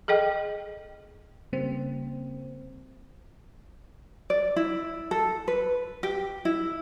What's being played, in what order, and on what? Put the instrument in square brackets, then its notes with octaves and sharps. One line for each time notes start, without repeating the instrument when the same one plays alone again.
[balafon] G#4 A4 D#5 G5
[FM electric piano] C#3 G3 A#3 C4
[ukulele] D5
E4
A4
B4
G4
E4